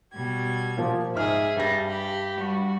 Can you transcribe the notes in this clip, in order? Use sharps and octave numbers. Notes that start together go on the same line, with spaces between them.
B2 G3 G#6
A#2 F3 A#3
G#2 G#4 E5 F6
G2 G3 A#6
G4 B5
G3 F#4